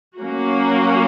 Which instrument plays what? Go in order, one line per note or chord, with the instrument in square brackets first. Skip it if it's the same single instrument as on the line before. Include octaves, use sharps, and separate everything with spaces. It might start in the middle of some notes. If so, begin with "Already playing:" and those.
[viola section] F#3 A#3 C#4 F#4